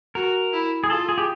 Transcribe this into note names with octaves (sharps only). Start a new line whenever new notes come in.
F#4 A#4
E4
G#4
F4 A4
G#4
G4